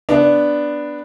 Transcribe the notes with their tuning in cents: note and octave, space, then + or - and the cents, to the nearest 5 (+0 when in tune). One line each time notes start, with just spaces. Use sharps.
B3 +0 D4 +0